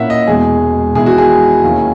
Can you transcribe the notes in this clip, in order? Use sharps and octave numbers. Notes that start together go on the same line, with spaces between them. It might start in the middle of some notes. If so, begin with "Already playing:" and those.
Already playing: A#2 A#3 C#4 E4 E5 F#5
D#5
E1 E2 B2 G#3 G#4
E2 D#3 G#3 B3 E4 G#4
F#4
G#4
D#2 D#3 A#3 C#4 E4